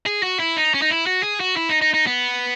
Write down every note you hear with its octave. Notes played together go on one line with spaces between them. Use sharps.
G#4
F#4
E4
D#4
C#4
D#4
E4
F#4
G#4
F#4
E4
D#4
D#4
D#4
B3